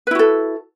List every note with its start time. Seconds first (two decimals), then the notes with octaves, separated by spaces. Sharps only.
0.07 B4
0.11 E4
0.15 F#4
0.19 A4